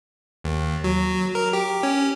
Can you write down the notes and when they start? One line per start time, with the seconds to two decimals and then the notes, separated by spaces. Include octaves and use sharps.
0.44 D#2
0.84 F#3
1.35 A#4
1.53 G4
1.83 C#4